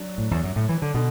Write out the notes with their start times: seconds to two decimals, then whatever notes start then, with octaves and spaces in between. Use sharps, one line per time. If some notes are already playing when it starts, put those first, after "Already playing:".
Already playing: F#3 D4
0.18 A2
0.31 E2
0.43 F#2
0.56 A2
0.69 E3
0.82 D3
0.94 B2 D3